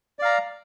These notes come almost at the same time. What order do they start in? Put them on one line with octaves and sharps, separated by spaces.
D5 F5 A#5